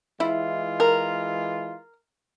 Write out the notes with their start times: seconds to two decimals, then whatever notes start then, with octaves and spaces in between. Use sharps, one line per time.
0.20 E3 G#3 E4 F4
0.80 A#4